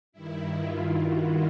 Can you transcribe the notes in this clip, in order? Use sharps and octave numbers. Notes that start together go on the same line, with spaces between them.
G2 D#3 E4
F4
F#4